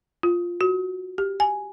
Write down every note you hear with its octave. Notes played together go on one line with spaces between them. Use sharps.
F4
F#4
G4
G#5